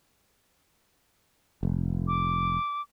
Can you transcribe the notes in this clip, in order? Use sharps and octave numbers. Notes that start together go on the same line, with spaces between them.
F1
D6